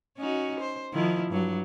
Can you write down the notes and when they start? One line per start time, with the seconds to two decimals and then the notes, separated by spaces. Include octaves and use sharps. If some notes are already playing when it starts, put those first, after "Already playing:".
0.18 C#4 D#4 F#4
0.60 C5
0.93 D#3 F3 E4
1.31 G2 F#3